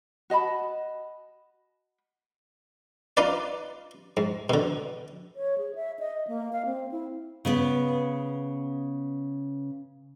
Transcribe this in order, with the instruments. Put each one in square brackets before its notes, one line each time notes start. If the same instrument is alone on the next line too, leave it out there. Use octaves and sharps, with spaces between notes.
[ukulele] F#4 D#5 A5 B5
[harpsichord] D#4 F4 B4 D5
G#2
B2 D3
[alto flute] C#5
G#4
E5
D#5
A#3
F5
C4
E4
[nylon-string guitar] C#3 B3 B4